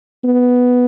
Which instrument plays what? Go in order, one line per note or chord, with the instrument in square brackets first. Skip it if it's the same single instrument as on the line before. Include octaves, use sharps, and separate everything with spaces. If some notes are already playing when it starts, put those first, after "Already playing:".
[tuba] B3